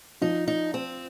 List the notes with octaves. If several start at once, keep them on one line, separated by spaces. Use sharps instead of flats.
F3 D#4
D#4
C4